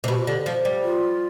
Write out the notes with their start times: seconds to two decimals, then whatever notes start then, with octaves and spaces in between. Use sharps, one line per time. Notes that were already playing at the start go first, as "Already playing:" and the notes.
0.04 C3
0.08 B2 G4
0.18 F4
0.26 D3 G4
0.46 F3
0.65 G3
0.84 F4